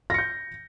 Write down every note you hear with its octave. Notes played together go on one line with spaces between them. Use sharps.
G6 A#6 C#7